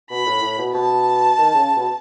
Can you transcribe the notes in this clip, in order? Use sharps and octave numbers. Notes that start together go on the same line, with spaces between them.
B2 B5
A2
A2
B2
B2 A5
D#3
C#3
B2